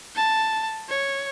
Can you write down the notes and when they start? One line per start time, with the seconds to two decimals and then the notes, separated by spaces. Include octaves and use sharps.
0.16 A5
0.89 C#5